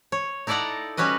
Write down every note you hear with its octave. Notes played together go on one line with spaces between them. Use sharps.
C#5
D#4 E4 A4 D5 F#5 A#5
G3 C#4 F#4 B4 D#5